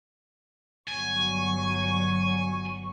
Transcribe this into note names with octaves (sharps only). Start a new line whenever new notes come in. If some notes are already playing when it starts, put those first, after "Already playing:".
G1 F#3 G#5 C#6